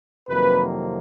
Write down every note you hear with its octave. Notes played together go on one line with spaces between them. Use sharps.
F2 C3 D#3 F#3 A#3 B4